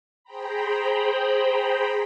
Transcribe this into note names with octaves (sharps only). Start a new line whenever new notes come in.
G#4 C5 G5 A#5 B5